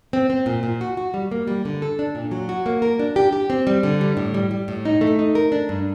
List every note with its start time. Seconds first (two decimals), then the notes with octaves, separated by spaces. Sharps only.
0.13 C4
0.30 C4
0.46 A#2
0.63 A#2
0.81 F#4
0.97 F#4
1.14 G3
1.31 A#3
1.47 G3
1.65 D3
1.82 A4
1.99 D4
2.15 A#2
2.31 F#3
2.49 F#4
2.66 A#3
2.82 A#4
2.99 D4
3.16 G4
3.33 G4
3.50 C4
3.67 G3
3.83 D3
4.01 G3
4.17 A2
4.34 G3
4.51 G3
4.68 A2
4.85 D#4
5.01 A3
5.19 D#4
5.35 A#4
5.52 D4
5.69 G2